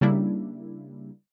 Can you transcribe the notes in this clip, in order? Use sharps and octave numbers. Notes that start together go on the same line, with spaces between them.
C#3 G3 A#3 D4 E4